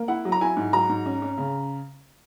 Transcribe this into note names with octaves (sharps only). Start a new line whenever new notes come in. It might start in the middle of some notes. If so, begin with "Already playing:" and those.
Already playing: A#3
E4 F#5
F#3
A#5
E4 G#5
G#2
F#3 A#5
G#2
C#4
C#4
C#3